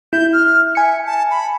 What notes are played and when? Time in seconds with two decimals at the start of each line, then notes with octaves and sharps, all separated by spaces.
0.13 E4 G6
0.33 F6
0.75 E5 G#5 C#7
1.05 A5
1.31 B5